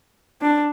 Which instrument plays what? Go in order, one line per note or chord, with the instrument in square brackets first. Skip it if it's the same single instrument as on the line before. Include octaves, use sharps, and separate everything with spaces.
[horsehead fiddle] D4